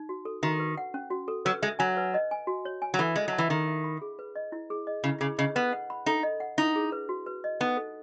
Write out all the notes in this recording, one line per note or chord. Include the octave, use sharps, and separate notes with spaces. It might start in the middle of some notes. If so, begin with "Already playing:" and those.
Already playing: D#4
F#4
A4
D#3 F#4
B4
F#5
C#4
F#4
A4
F#3 B4
G#3 E5
F#3 G#5
B4
D#5
G#5
F#4
C#5
G#5
F#3
E3 A4
G#3 D#5
F#3 A5
E3
D#3 A4
E5
B5
G#4
B4
D#5
E4
G#4
D#5
C#3 E4
C#3 G#4
C#3 D#5
B3 B4
F#5
B5
D#4 A4
D#5
F#5
D#4 E4
G#4
B4
F#4
B4
D#5
B3 D#4
A4